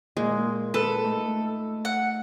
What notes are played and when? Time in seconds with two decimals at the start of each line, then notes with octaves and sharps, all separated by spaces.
0.17 A#2 G#3 A#3
0.74 A4 B4
1.04 A3 D#4
1.85 F#5